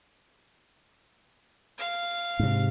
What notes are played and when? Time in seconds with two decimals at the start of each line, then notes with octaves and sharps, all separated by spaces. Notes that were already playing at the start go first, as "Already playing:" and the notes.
1.78 F5
2.39 G#2 C3